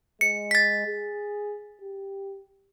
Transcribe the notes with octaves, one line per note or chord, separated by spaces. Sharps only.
G#3 C#7
A6 B6
G#4
G4